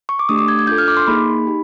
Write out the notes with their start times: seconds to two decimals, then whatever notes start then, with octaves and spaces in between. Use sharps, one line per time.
0.09 C#6
0.19 D6
0.29 A3 D4 G4 D#6
0.39 D6
0.48 G#6
0.59 G#6
0.67 D4 F4 A4 G6
0.78 F6
0.88 D6
0.97 C6
1.07 A#3 D#4 G#4 B5
1.47 D#4 G4